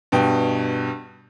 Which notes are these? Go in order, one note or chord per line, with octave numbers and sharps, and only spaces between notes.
G2 B2 G5